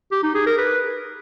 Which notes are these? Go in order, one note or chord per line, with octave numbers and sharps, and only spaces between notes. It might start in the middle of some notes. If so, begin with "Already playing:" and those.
G4
D#4
G#4
A#4
B4